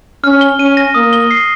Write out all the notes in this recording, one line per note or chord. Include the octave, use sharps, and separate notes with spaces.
C#4 F6
G7
C#4 D#7
A#6
A#3 D#6
G7
C7